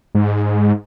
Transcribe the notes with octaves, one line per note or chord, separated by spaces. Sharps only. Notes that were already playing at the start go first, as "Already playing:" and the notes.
G#2